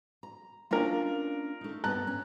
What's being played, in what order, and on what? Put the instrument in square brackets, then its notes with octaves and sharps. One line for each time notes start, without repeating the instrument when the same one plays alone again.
[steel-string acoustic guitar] A#5
[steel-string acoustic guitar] A#3 C#4 D4 [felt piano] F4 A#4
[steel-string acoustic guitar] A3 D#4
[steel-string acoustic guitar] G2 B3 [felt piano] A5 A#5 F#6
[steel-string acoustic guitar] C#4